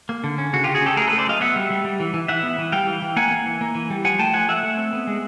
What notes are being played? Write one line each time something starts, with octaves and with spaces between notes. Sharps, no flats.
A#3
D3
C#4
C#3 F#4
C#3 F4 G4
F#4 G#4
C#4 G4 A4
A3 G#4 A#4
A3 A4 B4
C5 D5
F#3 D#5 F5
B3 E5 F#5
G3
G3
G3
E3
E3
E3 E5 F#5
B3
E3
G3 F5 G5
E3
E3
A#3 F#5 G#5
A#3
E3
A#3
E3
G3
F3 F#5 G#5
A3 G5 A5
F3 F#5 G#5
A3 E5 F#5
A3
C4
B3
G#3